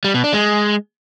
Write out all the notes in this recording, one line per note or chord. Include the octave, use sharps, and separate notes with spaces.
G3
B2
D4
G#3